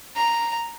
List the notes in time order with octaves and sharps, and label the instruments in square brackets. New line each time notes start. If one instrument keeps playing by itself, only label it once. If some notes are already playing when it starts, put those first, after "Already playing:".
[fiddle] A#5